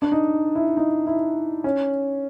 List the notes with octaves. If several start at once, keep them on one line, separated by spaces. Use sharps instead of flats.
D4
D#4
E4
D#4
E4
C#4